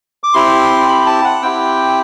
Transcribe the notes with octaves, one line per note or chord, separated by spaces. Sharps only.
D6
C4 E4 G4 C6
B5
A5
F#5
C4 E4 G4 G5